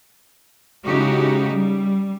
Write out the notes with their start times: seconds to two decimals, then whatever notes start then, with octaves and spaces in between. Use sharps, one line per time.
0.85 C#3 G#3 D#4 E4 F#4 G4
1.51 G3